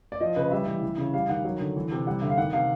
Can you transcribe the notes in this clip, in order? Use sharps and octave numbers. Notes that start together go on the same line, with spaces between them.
D5
F3 D#5
C#3 B4
G3 E5
E3
E3
C#3
G3 F5
D#3 F#5
F#3
D3
E3
C3
G3 F#5
D3 E5
F5
D#3 F#5
C3 F5